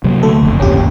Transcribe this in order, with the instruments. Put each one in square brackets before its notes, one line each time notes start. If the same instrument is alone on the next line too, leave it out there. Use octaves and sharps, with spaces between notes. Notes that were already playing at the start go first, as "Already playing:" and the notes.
[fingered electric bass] C3 F#3 A#3
[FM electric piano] D2 A3 A4
[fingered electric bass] F#1 F2
[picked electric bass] G#1 D#2 [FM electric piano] C#4 G4